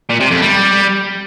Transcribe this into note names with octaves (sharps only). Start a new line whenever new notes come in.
A#2
C3
F2
G3